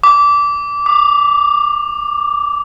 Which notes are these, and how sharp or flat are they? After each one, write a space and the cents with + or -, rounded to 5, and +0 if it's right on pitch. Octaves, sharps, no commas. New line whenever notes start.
D6 -20
D6 +25